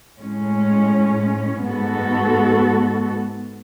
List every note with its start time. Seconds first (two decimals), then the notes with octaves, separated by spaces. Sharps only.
0.19 A2 G#3 C#4
1.64 G#2 G#3 B3 F#4 A4